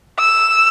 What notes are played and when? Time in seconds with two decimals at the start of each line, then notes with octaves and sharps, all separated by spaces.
0.19 E6